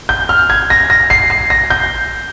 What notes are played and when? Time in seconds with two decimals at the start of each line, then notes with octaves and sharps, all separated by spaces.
0.09 G6
0.29 F6
0.50 G#6
0.70 A#6
0.90 A#6
1.10 C7
1.30 C7
1.50 A#6
1.70 G6